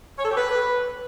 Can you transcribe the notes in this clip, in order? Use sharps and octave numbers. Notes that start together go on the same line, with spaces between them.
C#5
A4
G4
B4